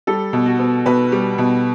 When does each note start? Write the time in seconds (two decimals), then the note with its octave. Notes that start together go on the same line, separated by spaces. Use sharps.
0.07 G3 A4
0.33 B2
0.46 F#4
0.59 B3
0.86 B2 B4
1.12 G3
1.38 B2